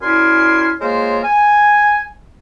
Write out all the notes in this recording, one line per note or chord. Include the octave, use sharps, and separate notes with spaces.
F#2 E4 D5 G#5 C6 F6
G#3 A#3 F4 A#4 C5 C#5
G#5